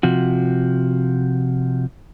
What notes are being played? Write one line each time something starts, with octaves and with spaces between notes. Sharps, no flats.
C3 F3 F#4